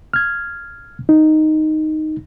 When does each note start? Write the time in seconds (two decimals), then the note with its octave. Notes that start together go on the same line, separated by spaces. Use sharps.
0.13 F6 G#6
1.09 D#4